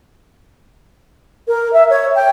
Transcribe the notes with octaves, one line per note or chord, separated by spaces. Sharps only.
A#4
E5
C#5
G5